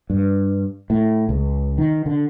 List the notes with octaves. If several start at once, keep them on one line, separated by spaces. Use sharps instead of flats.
G2
A2
C#2
D#3
D3